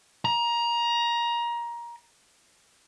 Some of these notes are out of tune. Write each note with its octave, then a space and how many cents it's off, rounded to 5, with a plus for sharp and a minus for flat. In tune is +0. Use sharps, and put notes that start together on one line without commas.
A#5 +20